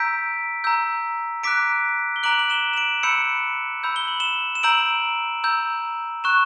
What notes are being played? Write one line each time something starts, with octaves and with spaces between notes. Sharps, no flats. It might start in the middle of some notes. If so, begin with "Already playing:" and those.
Already playing: A#5 E6 G6 B6 D7
A#5 E6 G6
A#5 D6 F#6 B6 D7
G7
A#5 D6 F#6 D7 F#7
F#7
E7 G7
E7
D7 F#7
B5 E6 G6 C#7 E7
B5 E6 G6
G7
F#7
E7 G7
E7
A#5 E6 G6 D7 F#7
A#5 E6 G6
C#6 F#6 E7